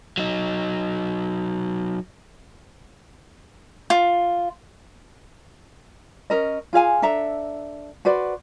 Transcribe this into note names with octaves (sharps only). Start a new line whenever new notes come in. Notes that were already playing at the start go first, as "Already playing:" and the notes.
F#3 D#4
F4
C#4 A#4 D#5
F4 G#4 F5 G#5
D4 A4 E5 A#5
F#4 B4 C5 D5